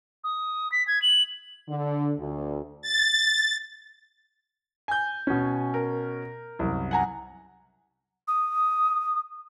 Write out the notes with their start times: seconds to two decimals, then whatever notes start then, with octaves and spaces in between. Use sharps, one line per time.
0.24 D#6
0.72 B6
0.87 G#6
1.02 F#7
1.69 D3
2.19 D2
2.82 A6
4.88 G#5 G6
5.27 B2 C#4
5.74 A#4
6.59 C2 F#2
6.91 F#5 G#5 A#5
8.28 D#6